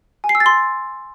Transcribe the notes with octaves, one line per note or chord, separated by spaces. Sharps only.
G#5
C7
E6
A6
C6